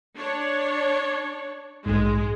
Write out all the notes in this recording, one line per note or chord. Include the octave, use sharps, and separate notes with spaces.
D4 C#5
A#1 G#2 G#3